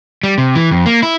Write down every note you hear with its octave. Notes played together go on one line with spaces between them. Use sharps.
G3
C3
E3
F2
A#3
E4